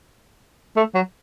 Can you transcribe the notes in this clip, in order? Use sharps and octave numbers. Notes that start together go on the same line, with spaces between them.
A3
F#3